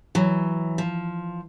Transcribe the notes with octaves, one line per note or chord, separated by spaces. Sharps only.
E3 F#3
F3